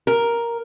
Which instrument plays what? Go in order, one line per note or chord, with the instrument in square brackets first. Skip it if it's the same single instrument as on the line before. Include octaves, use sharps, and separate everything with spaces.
[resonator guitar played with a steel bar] A#4